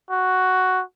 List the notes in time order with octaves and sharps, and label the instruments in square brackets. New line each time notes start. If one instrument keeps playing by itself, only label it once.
[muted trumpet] F#4